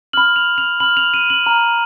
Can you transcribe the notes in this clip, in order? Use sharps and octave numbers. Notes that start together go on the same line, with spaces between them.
B5 F6 F#7
F7
F7
B5 F6 F#7
F7
D#7
F#7
A#5 F6